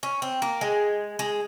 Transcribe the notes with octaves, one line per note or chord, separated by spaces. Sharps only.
C#4
C4
A#3
G#3
G#3